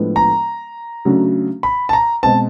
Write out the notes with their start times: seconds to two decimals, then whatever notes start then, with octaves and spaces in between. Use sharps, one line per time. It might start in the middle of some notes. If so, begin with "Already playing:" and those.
Already playing: A2 F3 G#3 B3 D4
0.16 A#5
1.05 C#3 F#3 A3 D4 F#4
1.63 B5
1.89 A5
1.93 A#5
2.23 B2 G#3 C4 A5